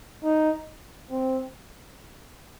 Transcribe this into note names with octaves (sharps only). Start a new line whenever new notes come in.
D#4
C4